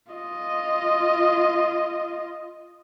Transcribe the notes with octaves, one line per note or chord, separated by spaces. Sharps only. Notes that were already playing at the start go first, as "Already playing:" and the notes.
F4 D#5